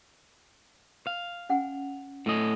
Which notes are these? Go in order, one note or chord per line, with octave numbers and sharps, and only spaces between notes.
F5
C#4 F#5 G#5
A2 A3 D#5